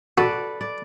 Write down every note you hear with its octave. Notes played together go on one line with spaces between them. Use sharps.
F#4 A4 B4 D5
D5